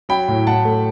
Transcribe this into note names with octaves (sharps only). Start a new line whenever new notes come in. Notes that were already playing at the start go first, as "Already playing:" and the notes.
F#3 G5 B5
A2
A2 F#5 A5
A3